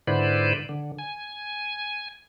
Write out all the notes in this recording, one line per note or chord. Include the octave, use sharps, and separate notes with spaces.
G#2 D3 E4 B4 C5 D5
D3
G#5